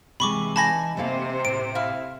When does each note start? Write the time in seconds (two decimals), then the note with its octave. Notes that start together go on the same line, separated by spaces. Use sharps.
0.20 C3 E3 G#3 B5 C#6 D6
0.56 D#4 G#5 A5 B5 A#6
0.97 C3 A3 A#3 C5 F5
1.45 A2 D7
1.75 E4 F5